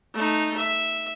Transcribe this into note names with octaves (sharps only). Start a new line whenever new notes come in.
A3 D#4
E5